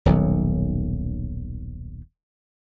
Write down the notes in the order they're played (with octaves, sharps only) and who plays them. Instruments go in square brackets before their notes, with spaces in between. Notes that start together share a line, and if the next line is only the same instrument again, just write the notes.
[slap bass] D#1 B1 D#3 F#3